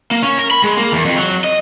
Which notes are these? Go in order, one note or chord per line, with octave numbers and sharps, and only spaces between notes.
A#3
C#4
A#4
B5
G#3
A#3
E2
F2
F#3
D#5